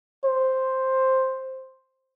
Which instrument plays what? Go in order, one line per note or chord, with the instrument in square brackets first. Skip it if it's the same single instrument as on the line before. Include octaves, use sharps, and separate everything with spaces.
[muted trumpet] C5